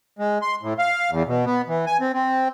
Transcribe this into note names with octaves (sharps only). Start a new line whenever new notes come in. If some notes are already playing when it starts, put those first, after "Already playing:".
G#3
C6
A2
F5
E2
B2
B3
E3
G#5
C4
C4